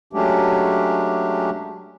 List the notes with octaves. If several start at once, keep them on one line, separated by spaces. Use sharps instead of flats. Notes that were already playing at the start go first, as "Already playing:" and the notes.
F#3 G#3 A3 C#4 D4 G4